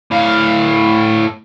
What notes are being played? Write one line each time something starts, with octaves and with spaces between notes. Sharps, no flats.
A2 F5